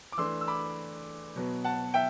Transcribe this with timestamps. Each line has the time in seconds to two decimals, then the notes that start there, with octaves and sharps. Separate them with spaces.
0.12 D6
0.17 E3 A3 D4 C6 E6
0.41 E6
0.48 B5 D6
1.36 B2 F#3 B3
1.64 F#5 A5
1.94 E5 G5